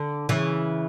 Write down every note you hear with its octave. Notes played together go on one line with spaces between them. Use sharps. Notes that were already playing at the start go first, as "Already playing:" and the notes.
Already playing: D3
C#3 E3